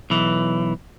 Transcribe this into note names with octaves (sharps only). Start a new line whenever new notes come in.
B1 E3